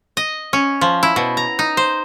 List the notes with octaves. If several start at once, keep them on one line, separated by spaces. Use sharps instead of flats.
D#5
C#4
F3
E4
B2
A#5
D#4
C5